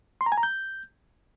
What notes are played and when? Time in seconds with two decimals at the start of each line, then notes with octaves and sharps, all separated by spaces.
0.21 C6
0.26 A#5
0.32 G#5
0.38 A#5
0.43 G6